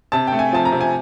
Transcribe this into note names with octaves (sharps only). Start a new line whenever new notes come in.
C3 A5
A3 G5
G#5
F3 A5
A#5
C3
G#5